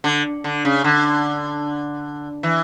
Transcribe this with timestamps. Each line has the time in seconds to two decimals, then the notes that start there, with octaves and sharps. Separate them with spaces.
0.04 D3
0.44 D3
0.65 C#3
0.84 D3
2.43 E3